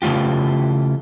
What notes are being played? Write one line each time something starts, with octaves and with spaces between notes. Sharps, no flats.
C#3 E3 A3 F4 G4